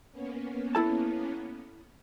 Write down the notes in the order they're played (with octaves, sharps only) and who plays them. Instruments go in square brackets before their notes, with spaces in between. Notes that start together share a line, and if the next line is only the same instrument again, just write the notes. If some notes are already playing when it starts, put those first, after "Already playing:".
[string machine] A#3 B3 C#4
[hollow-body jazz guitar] E4 A4 A5